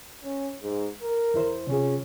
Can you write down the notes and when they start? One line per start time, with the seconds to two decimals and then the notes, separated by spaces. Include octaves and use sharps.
0.24 C#4
0.62 G#2
1.02 A#4
1.34 E2 E4 C5
1.67 C3 C#4 F4 G#4